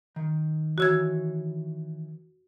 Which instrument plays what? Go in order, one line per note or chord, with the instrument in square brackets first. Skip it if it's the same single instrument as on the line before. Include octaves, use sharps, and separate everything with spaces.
[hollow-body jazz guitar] D#3
[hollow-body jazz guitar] D#3 E3 C#5 [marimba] F#4 E6 G#6